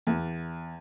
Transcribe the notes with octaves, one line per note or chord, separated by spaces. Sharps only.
E2